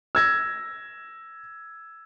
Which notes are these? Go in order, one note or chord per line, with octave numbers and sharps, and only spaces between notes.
E6 G#6 A#6